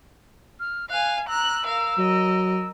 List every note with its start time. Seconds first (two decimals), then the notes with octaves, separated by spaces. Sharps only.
0.60 F6
0.90 F5 G#5 F#6
1.28 A#5 E6 F#6
1.65 A#4 F5
1.98 F#3 A#4 D#5